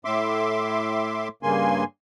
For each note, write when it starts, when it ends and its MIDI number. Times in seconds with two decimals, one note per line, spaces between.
0.05 1.28 45
0.05 1.28 76
0.05 1.28 84
0.05 1.28 86
1.43 1.84 43
1.43 1.84 49
1.43 1.84 58
1.43 1.84 80
1.43 1.84 84